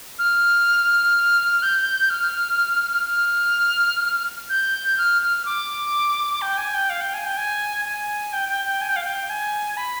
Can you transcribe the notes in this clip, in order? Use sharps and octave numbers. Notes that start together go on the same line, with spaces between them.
F6
G6
F6
F6
G6
F6
F6
D6
G5
G#5
G5
F5
G5
G#5
G5
G#5
G#5
G5
G5
G5
G#5
G5
F5
G5
G#5
B5